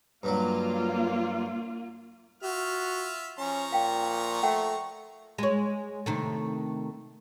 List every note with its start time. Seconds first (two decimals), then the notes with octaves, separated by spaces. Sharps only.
0.23 G2 F#3 A#3 F4
2.43 F4 F#4 E5 F6
3.38 F3 C#4 A#5 C#6
3.72 A#2 F5 G5
4.43 A3 F#5 G5
5.38 G#3 C#5
6.06 C3 D#3 A3